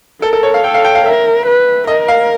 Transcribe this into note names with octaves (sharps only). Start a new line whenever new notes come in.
A4 A#4
A4
C#5
F5
A4 G5
F5
G5
F5
A#4 E5
B4
A#4 D#5
F5